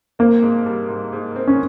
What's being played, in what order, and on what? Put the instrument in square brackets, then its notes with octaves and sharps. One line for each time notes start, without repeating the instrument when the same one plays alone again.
[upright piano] A#3 [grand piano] C4
[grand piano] G#2
G3
G#2
G#2
C4
[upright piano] C#4